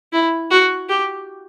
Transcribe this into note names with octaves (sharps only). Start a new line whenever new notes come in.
E4
F#4
G4